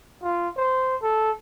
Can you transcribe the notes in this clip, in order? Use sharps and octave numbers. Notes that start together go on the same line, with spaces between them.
F4
C5
A4